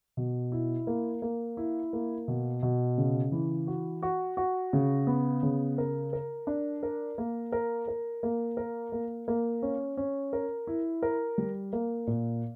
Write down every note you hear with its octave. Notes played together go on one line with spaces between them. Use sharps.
B2
E4
A#3
A#3
E4
A#3
B2
B2
C#3
E3
F#4
F#4
F#4
C#3
B3
C#3
A#4
A#4
D4
A#4
A#3
A#4
A#4
A#3
A#4
A#3
A#3
C#4
C#4
A#4
E4
A#4
G3
A#3
A#2